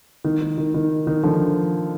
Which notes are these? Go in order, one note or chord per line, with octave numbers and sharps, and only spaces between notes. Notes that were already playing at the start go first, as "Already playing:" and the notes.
D#3
D#3
D#3
D#3
D#3
D3 F3